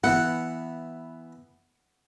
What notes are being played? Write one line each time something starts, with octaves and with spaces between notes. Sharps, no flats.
E3 B3 E4 F#5